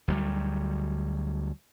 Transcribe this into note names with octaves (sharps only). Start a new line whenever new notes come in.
D2 F#3 G3